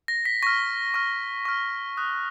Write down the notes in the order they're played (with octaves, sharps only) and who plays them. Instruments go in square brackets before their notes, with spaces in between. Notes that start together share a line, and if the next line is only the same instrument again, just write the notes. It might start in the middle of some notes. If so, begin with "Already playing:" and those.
[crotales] A#6
B6
C#6 F6 A#6
C#6 F6
C#6 F6
D#6 F#6